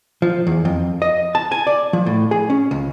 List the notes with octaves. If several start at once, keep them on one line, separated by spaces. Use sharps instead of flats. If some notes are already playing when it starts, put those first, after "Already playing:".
F3
E2
F2
D#5
A5
G#5
D5
F3
A2
G#4
C#4
C#2